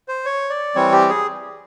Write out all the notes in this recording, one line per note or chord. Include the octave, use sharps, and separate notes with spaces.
C5
C#5
D5
E3 G3 C4 C#5
G4
G#4